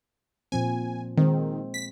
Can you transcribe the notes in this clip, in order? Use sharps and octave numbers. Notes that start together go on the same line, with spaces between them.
A#2 F3 C4 G#5
D#3 G#3 C4
B6